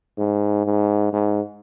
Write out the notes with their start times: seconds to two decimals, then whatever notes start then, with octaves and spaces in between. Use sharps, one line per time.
0.18 G#2
0.66 G#2
1.13 G#2